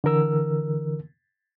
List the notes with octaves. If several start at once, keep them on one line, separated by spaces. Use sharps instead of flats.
D3 E3 A#4 E6